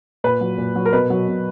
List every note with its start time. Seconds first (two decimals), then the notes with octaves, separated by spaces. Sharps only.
0.24 A#2 B4
0.41 F#3
0.58 A#2
0.76 F#3
0.86 A#4
0.93 B2 B4
1.10 F#3
1.28 B2